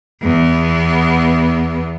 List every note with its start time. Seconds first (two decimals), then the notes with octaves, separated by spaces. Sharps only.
0.22 E2 B3